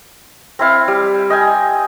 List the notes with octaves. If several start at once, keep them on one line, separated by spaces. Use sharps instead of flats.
C4 E4 F5
G3
D#5 G5 G#5